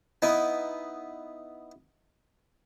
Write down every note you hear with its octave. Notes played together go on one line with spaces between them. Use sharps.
B3 D#4 E4